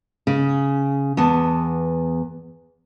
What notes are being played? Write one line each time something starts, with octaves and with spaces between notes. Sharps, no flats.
C#3
E2 B3 A5